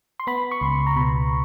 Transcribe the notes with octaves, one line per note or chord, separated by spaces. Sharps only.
C6
B3 B5
C#6
C#2 C6
A#5
B2 B5